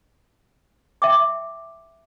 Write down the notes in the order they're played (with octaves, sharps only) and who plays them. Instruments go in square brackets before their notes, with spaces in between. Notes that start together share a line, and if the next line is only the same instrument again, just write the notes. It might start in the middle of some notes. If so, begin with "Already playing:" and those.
[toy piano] E5 G5 D6